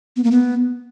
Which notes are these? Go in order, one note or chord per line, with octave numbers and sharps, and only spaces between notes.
B3
A#3
B3